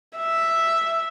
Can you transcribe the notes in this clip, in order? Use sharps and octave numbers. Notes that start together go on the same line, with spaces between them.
E5